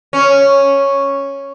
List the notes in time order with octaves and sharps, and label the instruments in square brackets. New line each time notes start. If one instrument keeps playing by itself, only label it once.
[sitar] C#4